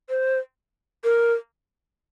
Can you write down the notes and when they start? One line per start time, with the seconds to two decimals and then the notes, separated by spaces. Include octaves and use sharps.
0.09 C5
1.04 A#4